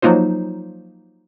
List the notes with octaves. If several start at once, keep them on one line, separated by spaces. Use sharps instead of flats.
F3 F#3 A#3 D#4 F4 C5